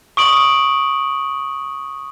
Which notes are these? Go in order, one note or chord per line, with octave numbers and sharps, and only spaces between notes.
C#6 D#6 D7 F#7